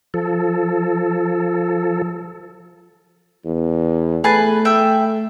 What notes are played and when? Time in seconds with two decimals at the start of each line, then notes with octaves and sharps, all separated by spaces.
0.14 F3 A4
3.46 E2
4.24 A3 G#4 B4 A5
4.65 E5 G5